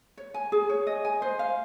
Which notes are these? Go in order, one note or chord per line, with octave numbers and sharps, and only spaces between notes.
C#5
G#5
G#4
C#5
D#5
G#5
C5
F5